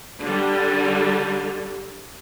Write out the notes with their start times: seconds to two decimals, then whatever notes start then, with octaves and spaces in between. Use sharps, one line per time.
0.22 D3 G3